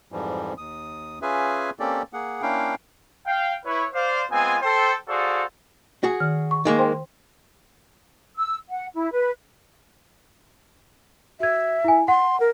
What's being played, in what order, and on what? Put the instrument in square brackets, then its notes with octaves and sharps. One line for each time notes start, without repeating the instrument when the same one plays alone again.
[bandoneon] F2 G#2 E3 F3 G3
D#2 D#6
C#4 F4 G#4 B4 E5 G#5
A#3 C4 C#4 G4 A4 D5
A#3 G#4 F#5
A#3 C#4 D4 E4 F5 G5
[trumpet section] F5 G5
E4 B4 C#5
C5 D5 F5
G#3 B3 C4 F4 G#5
A4 C5 G5
F#4 G#4 A4 C5 D5 F5
[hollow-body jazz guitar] F#4 G#4
[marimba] D#3 F6
C#6
[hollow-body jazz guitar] D#3 G#3 A#3
[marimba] C5 G5 C6
[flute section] E6
F#5
E4
B4
[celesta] F#4 G#6 [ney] E5
[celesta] E4 G#5
[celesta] F#5 [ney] C6
[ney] A#4